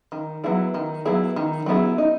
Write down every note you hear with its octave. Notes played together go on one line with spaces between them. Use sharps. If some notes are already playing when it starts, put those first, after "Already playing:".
D#3
F#3 B3 E4 G#4
D#3
F#3 B3 E4 G#4
D#3
F#3 B3 E4 G#4
D#4